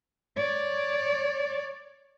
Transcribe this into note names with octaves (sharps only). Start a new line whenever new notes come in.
C#5 D5